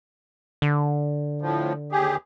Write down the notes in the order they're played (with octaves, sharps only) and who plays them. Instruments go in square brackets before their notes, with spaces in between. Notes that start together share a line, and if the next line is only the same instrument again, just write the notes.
[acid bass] D3
[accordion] A2 F3
D#2 G4 G#4